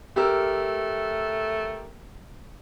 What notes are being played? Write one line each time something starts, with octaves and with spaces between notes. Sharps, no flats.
A3 G4 A#4 E6